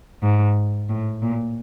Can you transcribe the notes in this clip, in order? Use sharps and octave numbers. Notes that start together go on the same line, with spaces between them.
G#2
A2
A#2